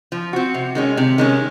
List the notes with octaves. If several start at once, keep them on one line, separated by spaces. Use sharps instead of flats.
F3
C4 F#4
C3
D#3 G#3 C#4
C3
D#3 G#3 C#4